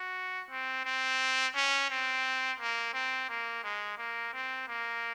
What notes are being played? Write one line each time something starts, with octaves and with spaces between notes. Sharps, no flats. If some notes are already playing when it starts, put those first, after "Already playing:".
Already playing: F#4
C4
C4
C#4
C4
A#3
C4
A#3
G#3
A#3
C4
A#3